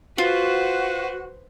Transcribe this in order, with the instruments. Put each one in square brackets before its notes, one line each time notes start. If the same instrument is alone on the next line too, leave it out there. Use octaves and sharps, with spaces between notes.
[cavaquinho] F4 [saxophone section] F#4 [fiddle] B4 C5